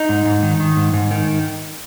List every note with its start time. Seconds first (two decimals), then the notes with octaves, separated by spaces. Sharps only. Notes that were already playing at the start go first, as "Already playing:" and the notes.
Already playing: D#4
0.09 G#2
0.25 G#2
0.43 D#3
0.60 D#3
0.77 G#2
0.93 G#2
1.11 D#3